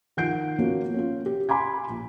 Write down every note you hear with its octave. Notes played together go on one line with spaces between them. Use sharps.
D#3 F3 F#5 G6 C7 D7
F3 A#3 B3 C#4 F#4
C#4 F4
G4
G#5 B5 C6 D6 G#6
A#1